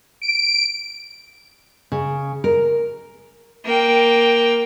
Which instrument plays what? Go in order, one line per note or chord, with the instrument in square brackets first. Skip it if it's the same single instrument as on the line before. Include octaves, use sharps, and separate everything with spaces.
[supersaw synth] D7
[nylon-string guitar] C#3
A#4
[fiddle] A#3 G5